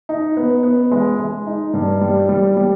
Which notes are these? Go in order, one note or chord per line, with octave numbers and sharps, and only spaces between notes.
D#4
B3
B3
G#3
G#3
D#4
G2
G3
G3
G3